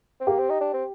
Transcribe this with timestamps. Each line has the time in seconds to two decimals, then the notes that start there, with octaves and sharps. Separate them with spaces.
0.20 C4
0.27 A#3 G4
0.39 C4
0.50 D#4
0.61 D4
0.74 C4